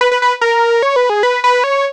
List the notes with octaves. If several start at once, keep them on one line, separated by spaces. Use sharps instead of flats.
B4
B4
B4
A#4
C#5
B4
G#4
B4
B4
C#5